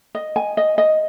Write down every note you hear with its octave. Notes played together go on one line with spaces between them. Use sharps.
D#5
G#5
D#5
D#5